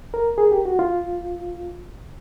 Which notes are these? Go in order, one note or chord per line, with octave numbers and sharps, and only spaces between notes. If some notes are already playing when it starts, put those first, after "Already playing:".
A#4
G#4
G4
F#4
F4